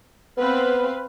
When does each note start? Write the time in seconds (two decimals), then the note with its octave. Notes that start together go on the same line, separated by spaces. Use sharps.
0.37 B3 C4 B4 F5